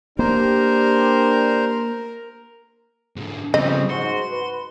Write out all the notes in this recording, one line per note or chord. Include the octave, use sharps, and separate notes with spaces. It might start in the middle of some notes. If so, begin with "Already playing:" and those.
A#3 D4 G4 A#4 C5
G#2 D3
C#3 F3 G3 B3 C4 D#5
G#2 F#4 C6
B4